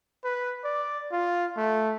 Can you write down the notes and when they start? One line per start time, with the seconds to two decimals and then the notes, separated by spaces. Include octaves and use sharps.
0.24 B4
0.64 D5
1.12 F4
1.57 A3